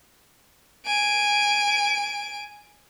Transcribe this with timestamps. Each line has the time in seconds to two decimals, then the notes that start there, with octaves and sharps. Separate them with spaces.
0.86 G#5 D7